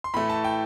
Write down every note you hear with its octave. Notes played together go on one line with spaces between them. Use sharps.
C6
A2 E3 A3 B5
A5
G5